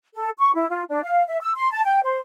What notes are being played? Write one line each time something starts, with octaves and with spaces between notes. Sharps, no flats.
A4
C#6
E4
F4
D4
F5
E5
E6
C6
A5
G5
C5